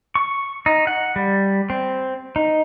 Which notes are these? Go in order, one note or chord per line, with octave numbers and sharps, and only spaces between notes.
C#6
D#4
F#5
G3
C4
D#4